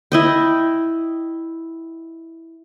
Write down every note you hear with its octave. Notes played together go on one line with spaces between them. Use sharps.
E4 D#5 G5